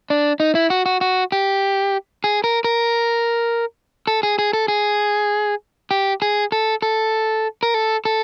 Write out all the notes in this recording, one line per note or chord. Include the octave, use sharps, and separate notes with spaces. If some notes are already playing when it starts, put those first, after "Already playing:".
D4
D#4
E4
F#4
F#4
F#4
G4
G#4
A#4
A#4
A4
G#4
G#4
A4
G#4
G4
G#4
A4
A4
A#4
A4
A4